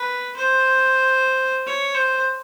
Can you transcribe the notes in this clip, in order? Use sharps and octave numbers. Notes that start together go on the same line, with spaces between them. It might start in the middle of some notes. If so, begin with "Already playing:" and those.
Already playing: B4
C5
C#5
C5